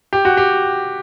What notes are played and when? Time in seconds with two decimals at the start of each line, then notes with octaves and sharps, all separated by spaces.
0.13 G4
0.25 F#4
0.37 G4